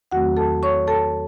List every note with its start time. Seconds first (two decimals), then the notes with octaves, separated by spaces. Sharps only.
0.11 E2 D#3 F#3 A3 C4 F#4 F#5
0.37 A4 A5
0.63 C#5 C#6
0.87 A4 A5